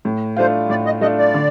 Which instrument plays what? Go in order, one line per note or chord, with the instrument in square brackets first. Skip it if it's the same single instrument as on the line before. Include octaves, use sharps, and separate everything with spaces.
[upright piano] A2
[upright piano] A3 D4 F4 [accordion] C5
[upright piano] A2 [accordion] D5
[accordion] D#5
[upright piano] A3 D4 F4 [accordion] D#5
[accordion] D5
[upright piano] D3